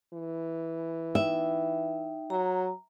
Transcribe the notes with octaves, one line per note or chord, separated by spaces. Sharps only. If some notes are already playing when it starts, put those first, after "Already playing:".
E3
D#4 E5 G5
F#3 A#5